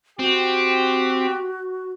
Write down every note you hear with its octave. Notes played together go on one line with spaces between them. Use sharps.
C4 F#4 G4